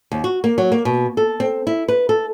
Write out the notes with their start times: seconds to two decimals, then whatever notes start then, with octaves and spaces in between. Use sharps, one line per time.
0.12 D#2
0.24 F#4
0.44 A#3
0.58 F#3
0.72 A#3
0.85 B2
1.17 A4
1.40 C4
1.67 E4
1.88 B4
2.09 A4